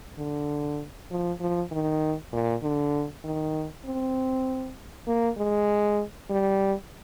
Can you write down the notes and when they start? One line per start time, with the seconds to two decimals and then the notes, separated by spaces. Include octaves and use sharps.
0.19 D3
1.11 F3
1.41 F3
1.72 D#3
2.33 A#2
2.63 D3
3.25 D#3
3.86 C4
5.08 A#3
5.38 G#3
6.30 G3